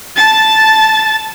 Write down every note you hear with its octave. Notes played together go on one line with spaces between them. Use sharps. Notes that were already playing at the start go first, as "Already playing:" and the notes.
A5 A6